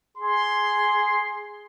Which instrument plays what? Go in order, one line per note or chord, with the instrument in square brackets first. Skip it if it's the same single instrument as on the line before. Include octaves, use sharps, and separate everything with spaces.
[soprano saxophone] G#4 [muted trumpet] C6